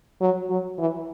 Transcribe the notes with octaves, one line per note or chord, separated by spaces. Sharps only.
F#3
F#3
E3